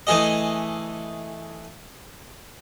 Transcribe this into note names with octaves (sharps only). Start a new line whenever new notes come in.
E3 A3 G#4 D#5